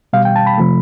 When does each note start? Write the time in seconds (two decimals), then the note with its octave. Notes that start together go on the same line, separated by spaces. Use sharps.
0.13 B2 G3 F5
0.25 G5
0.36 A5
0.47 B5
0.58 C3 F3 A3